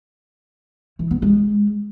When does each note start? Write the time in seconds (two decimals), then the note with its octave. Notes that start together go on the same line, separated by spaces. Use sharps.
0.99 E3
1.11 B3
1.22 G#3